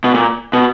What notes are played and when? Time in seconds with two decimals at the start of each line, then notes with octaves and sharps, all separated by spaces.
0.04 B2
0.14 A#2
0.53 B2